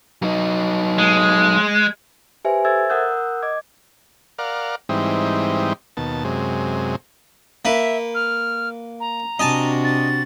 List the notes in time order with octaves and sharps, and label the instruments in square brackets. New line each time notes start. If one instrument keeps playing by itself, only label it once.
[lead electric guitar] F#3 D#4
[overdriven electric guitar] G#3
[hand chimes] G4 B4 C5 E5 G#5
A4 C5 E5 E6 G#6 A6
A#4 F#5 D#6 E6 F#6 G6
D#5 D6 G#6
[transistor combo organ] A#4 D5 F5 F#5
G#2 E3 G3 C4 D#4
D#2 B2 A5
F#2 C3 G#3
[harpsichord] A#3 B4 [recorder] E5
[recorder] F6
A#5
[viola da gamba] C3 D4 F#4 [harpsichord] D#5 G#5 A5
[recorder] A6